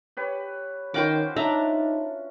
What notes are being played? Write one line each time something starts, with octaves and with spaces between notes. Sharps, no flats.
G4 B4 C#5
D#3 C#4 F4 F#4 C5 G5 D6
D4 D#4 E5 A#5